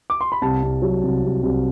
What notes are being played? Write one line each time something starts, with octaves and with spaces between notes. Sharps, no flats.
D6
C6
B5
C2 A5
C2
F#3
C2
C2
C2